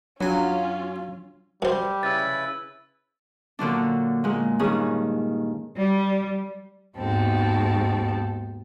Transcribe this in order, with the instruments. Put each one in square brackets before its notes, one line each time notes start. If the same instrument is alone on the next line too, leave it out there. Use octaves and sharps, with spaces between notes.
[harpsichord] F#2 G#5 [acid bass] F#3 [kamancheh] C#4 F4 [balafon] D4
[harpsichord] F#2 C5 [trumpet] G3
[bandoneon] C#3 E4 B4 [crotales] E6 A6
[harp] A#2 D3 F#3 D4
A#2 G#3
G2 D#3 C#4 G#4 D#6
[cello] G3
[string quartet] D#2 G#2 B2 C4 A4